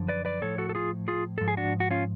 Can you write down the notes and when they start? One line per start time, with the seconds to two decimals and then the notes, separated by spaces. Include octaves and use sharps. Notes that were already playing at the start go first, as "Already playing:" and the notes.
Already playing: F#2 D3 F3
0.08 B4 D5
0.25 B4 D5
0.42 A2 F3 A4 C#5
0.58 F#4 A4
0.69 A4
0.75 F4 G#4
1.08 F4 G#4
1.38 G#2 F3 A4
1.48 G#4
1.57 D4 F#4
1.80 F#4
1.91 C#4 F4